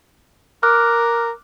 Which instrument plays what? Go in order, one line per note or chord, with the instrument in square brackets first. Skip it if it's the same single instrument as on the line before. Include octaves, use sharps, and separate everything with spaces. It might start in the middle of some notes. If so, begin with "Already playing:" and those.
[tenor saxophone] A#4 [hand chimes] D6 F6 F#6